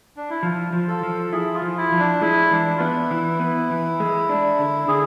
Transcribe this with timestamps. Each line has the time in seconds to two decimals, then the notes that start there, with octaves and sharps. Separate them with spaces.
0.17 D4
0.30 E4
0.43 F3 F4
0.73 F3
0.88 A4
1.03 F3
1.33 E4 G#4
1.55 F4
1.62 F3
1.77 E4
1.92 F3
1.99 D4
2.21 G#3 E4
2.51 E3 D4
2.76 F4
2.80 B3 E4
3.11 E3
3.40 B3
3.70 E3
4.00 G#3
4.29 D4
4.59 D3
4.88 D3 G#4